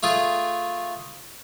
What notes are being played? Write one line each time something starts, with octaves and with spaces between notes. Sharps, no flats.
A3 F4 G#4